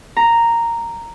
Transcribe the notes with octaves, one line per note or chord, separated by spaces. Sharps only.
A#5